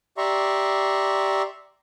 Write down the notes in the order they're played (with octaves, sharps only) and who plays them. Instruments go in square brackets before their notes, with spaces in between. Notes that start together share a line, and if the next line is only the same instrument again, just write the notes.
[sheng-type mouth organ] G4 D5 E5 A#5 C6 C#6